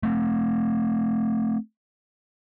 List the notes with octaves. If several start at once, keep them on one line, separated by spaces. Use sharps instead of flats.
A3 C4